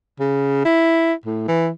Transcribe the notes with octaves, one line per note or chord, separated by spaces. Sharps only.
C#3
E4
A2
E3